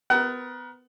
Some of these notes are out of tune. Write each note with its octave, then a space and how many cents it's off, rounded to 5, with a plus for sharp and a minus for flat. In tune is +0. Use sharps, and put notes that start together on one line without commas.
B3 +25 A#4 +40 F#5 +30